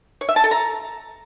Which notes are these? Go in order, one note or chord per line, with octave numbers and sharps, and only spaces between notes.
C#5
E5
A5
A4
A#5